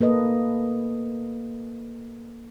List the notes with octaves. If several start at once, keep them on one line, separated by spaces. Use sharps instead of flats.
A#3 A4 B4 D#5